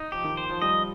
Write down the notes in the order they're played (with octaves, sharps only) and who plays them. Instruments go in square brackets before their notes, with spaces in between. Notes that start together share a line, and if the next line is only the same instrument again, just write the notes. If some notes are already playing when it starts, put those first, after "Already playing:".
Already playing: [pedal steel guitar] D#4
[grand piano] F3 [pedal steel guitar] G4
[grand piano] D#3
[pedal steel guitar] C5
[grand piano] F3
[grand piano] G3 [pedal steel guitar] D#5